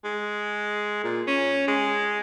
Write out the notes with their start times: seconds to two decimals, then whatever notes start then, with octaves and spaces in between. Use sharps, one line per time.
0.05 G#3
1.04 A#2
1.27 C#4
1.68 G#3